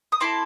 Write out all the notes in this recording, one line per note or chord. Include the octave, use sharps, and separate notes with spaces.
D#6
C4 E4 A4 C6 D6